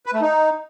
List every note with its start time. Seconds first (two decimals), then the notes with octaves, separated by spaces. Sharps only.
0.06 B4
0.14 A3
0.21 D#4